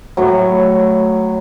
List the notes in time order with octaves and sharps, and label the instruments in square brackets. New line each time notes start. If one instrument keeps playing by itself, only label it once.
[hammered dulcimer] A2 F#3